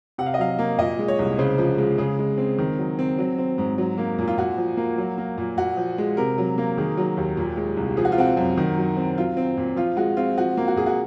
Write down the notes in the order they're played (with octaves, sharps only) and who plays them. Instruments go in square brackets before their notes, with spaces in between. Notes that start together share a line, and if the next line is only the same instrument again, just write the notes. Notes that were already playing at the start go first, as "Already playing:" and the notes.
[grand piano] C3 F#5
F5
D#5
F#3 F5
A#3
A#2 D#5
G#3
C#5
C2
C#3 C5
F3
G#3
C#3 G#4
G#3
C4
D#3
F#3
C4
F#3
C4
G#2
F#3
A#3
A#2
F4
A#2 F#4
F3
A#3
F#3
A#3
A#2
A#2 F#4
F3
G#3
C3 A#4
F#3
A#3
D#3 G#4
F#3
D#2
A#2
G#3
C2
F3 G#4
F#4
F4
C4 F#4
F#2
D#3
F#3
C4
F#3 F4
C4
A#2
F3 F4
G#3 F#4
C4 F4
F3 F#4
A#3
F#4
A#2 G#4
F#4